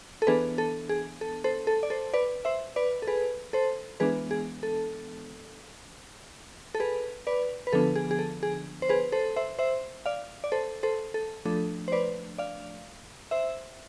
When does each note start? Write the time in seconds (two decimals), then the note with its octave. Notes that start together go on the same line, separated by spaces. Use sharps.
0.22 A4
0.27 E3 B3 D4 G#4 B4
0.58 A4
0.89 G#4
1.21 A4
1.44 A4 C5
1.67 A4
1.83 D5
1.90 A4 C5
2.13 B4 D5
2.45 C5 E5
2.76 B4 D5
3.02 A4
3.07 G#4 B4
3.53 A4 C5
4.00 E3 G#3 B3 D4 G#4 B4
4.31 G#4
4.63 A4
6.75 A4
6.80 G#4 B4
7.27 B4 D5
7.67 B4
7.73 D3 F3 B3 D4 A4
7.96 G#4
8.11 G#4
8.19 A4
8.43 G#4
8.82 C5
8.89 G#4 B4
9.12 A4 C5
9.36 C5 E5
9.59 C5 E5
10.06 D5 F5
10.44 D5
10.52 A4 C5
10.83 A4 C5
11.14 A4
11.45 F3 A3 D4 A4
11.88 C5
11.92 B4 D5
12.38 D5 F5
13.31 C5 E5